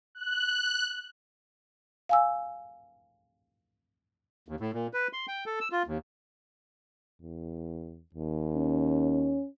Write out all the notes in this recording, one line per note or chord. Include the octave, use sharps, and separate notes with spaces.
F#6
F5 G#5 E6
D#2
A2
A#2
B4
C6
G5
A4
E6
F4
D#2
E2
D#2
C#4